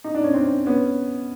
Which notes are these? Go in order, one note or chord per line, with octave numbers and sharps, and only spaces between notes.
D#4
D4
C#4
C4 D4
B3 C#4